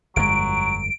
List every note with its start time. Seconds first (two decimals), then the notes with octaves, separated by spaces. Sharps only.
0.16 G1 F2 F#3 G#3 D7